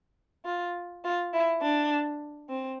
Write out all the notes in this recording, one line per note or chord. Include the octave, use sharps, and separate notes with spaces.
F4
F4
E4
D4
C4